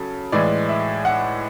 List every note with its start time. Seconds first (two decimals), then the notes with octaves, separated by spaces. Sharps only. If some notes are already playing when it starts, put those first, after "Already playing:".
Already playing: C#3 F#3 A4
0.32 A2 E3 G#3 D5
0.69 E5
1.05 F#5